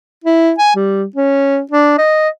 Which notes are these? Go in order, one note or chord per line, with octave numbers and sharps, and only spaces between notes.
E4
G#5
G3
C#4
D4
D#5